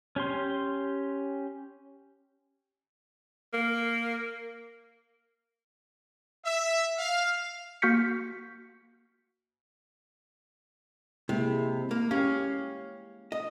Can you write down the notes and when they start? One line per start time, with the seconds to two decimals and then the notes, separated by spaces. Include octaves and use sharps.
0.16 C#4 G4 C6
3.54 A#3
6.45 E5
6.98 F5
7.82 A#3 F#4 F6 G6 B6 C#7
11.29 C3 G#3 A#3 E4
11.91 A#3
12.11 C#4 G4 F5
13.32 D#5